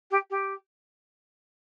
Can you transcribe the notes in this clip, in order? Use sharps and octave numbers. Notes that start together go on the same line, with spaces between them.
G4
G4